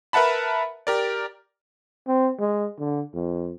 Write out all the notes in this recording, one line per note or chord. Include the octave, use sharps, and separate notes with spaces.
A#4 B4 E5 F#5 A5 B5
G4 A#4 D5
C4
G#3
D3
F2